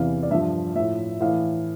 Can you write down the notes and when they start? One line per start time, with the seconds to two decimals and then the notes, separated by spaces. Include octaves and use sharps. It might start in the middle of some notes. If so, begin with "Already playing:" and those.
Already playing: E2 C3 E3 F5
0.23 D5
0.31 G2 E5
0.34 F3
0.75 A2 F3 E5
1.21 A2 E3 F5